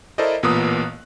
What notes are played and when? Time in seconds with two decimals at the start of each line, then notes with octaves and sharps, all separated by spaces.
0.18 E4 A4 A#4 C5 D5 D#5
0.43 A1 A#2 A#3 B3 D#6 F#6